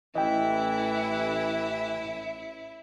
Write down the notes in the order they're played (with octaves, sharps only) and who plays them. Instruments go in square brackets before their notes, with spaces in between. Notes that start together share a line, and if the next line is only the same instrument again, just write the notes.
[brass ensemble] A1 [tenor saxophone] E3 [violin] E4 E5 [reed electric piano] D#5 G5